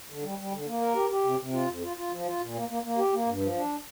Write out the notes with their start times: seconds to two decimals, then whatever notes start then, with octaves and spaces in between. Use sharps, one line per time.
0.09 D3
0.23 G3
0.38 G3
0.52 D3
0.67 A#3
0.81 A#4
0.95 G4
1.10 G4
1.24 C3
1.39 C3
1.53 F4
1.67 F2
1.83 F4
1.97 F4
2.12 F3
2.26 F4
2.41 A#2
2.54 A#3
2.68 A#3
2.83 A#3
2.97 G4
3.13 A#3
3.26 G2
3.41 F3
3.55 D4